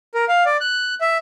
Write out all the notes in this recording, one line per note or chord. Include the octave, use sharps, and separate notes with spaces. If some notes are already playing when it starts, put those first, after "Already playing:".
A#4
F5
D5
F#6
E5